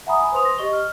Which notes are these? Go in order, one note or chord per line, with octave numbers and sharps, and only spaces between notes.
E5 F#5 G#5 A#5 B5 D#6
G#5
B4 C5 C6 D#6 F7
A#6
G4 D#5 C#6 G7
F6